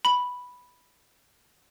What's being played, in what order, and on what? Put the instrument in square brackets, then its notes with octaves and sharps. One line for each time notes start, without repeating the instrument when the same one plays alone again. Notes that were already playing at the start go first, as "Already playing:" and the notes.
[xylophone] B5 F#7